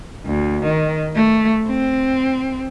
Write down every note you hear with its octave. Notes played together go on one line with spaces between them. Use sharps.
D2
D#3
A3
C4